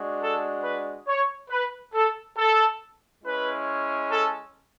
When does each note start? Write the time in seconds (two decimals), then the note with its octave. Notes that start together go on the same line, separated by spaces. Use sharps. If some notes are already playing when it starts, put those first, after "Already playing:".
Already playing: G#3 D4 F#4
0.20 A4
0.64 B4
1.07 C#5
1.50 B4
1.94 A4
2.37 A4
3.23 G#3 C#4 E4 B4
4.10 A4